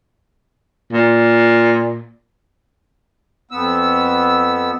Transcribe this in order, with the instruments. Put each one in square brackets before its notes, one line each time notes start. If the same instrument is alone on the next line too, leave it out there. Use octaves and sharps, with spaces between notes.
[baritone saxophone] A#2
[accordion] F2 B3 E6